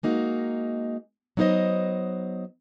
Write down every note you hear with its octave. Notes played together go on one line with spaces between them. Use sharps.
G#3 A#3 D#4 F#4
F#3 B3 D#4 B4 C5 D#5